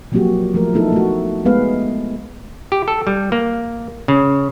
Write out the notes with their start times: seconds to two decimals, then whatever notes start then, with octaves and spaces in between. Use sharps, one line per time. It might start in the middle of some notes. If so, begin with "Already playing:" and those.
0.12 F3 F#3 A#3 C4 F#4 G4
0.54 F3 A3 A#4
0.74 A3 B3 D#4 E4 A4
0.93 A3 F#4
1.45 G#3 A3 B3 G#4 B4 F5
2.72 G4
2.88 A4
3.07 G3
3.32 A#3
4.08 C#3